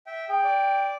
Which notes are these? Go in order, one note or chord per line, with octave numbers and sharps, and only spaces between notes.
E5 G5
G#4 G5
D5